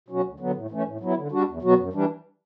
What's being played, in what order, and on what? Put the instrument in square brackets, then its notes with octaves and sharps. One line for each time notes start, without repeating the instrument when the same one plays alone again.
[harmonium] B2 F#3 C#4 F#4
D2
D3 F#3 B3
A2
E3 A3 C#4
A2
F#3 B3 E4
D3
G3 D4 F#4
E2
B2 F#3 B3 F#4
F#2
E3 G3 D4